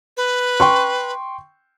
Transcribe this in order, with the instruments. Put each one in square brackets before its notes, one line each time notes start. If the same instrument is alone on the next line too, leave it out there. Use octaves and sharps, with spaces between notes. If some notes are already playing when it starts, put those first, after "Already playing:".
[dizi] B4
[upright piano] G5 C6 C#6